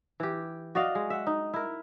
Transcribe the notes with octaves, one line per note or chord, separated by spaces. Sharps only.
E3 G4
F#4 D5 D#5 F5
G#3
E5 F#5
D#4
E4 A#4